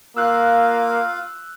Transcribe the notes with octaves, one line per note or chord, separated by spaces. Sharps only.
A#3 F4 F5 E6 F#6